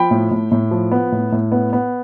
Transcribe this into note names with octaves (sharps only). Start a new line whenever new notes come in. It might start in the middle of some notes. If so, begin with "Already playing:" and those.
Already playing: F3 G5 B5
A2
A2
A2
F3
B3
A2
A2
B3
B3